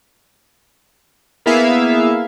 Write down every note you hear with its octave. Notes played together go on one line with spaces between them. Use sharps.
A#3 B3 E4 G#4 E5 F5